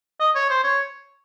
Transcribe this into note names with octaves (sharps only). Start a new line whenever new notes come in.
D#5
C#5
C5
C#5